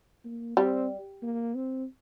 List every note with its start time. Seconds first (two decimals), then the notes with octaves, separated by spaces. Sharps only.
0.25 A#3
0.57 G3 C4
1.22 A#3
1.55 C4